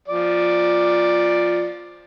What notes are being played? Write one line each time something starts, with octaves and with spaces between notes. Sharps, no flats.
F3 D5